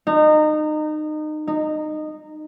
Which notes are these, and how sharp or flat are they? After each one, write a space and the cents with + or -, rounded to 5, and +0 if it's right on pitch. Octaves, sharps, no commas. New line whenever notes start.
D#4 -25
D#4 -15